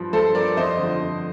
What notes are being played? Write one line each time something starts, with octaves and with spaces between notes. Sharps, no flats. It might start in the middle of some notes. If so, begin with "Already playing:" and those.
Already playing: G2 F3
G2 A4 C5
F3 A#4 D5
F2 C5 D#5
D3 F3
F2